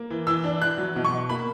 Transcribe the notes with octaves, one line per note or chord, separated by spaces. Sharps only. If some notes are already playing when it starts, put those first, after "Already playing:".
Already playing: A#3
E3
E3 E6
D4
E3 F#6
F#3
B2
C#6
B2
A#3 B5